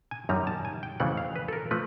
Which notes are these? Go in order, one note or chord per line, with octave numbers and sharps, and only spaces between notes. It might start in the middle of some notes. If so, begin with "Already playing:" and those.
G#5
F#2 D#3 G3 A#5
A5
G#5
G5
F2 C#3 E3 A3 F#5
F5
B4
A4
A#4
F3 A3 B4